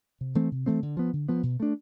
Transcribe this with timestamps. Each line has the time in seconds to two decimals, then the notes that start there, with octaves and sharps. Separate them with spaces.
0.21 C3
0.35 E3 A3 C4
0.52 C3
0.66 E3 A3 C4
0.83 D3
0.97 F3 B3
1.13 D3
1.29 F3 B3
1.43 B2
1.60 A3 D4